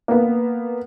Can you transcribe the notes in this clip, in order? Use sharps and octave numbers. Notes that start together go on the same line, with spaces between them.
A#3 B3